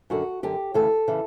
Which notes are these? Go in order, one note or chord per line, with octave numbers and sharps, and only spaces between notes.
F#2 D3 F#4
F#2 D3 G4
D2 C#3 E3 A4
C#3 E3